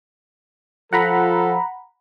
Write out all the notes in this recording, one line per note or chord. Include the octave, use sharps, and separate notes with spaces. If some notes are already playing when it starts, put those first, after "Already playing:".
F3 F4 A4 F#5 A#5 B5